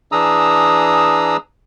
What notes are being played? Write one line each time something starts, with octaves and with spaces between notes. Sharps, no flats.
E3 D4 G#4 A#5 D#6 E6